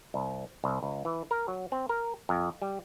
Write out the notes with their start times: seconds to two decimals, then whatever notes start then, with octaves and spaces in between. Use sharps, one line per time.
0.14 C2
0.64 C2
0.83 C#2
1.05 E3
1.31 A#4
1.48 F#3
1.72 C4
1.89 A#4
2.29 F2
2.62 G3